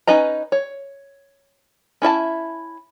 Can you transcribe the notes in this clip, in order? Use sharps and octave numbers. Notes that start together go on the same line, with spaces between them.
C#4 D#4 B4 D#5 A#5
C#5
C#4 E4 E5 A5